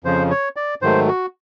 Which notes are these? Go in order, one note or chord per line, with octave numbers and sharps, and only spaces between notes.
F2 C#3 F3 C5
C#5
D5
G#2 D#3 F#3 A3 C5
F#4